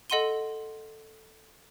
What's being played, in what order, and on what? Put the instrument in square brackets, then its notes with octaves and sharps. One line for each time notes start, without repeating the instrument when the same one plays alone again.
[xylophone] A4 D#5 F#5 C6 D#7 G7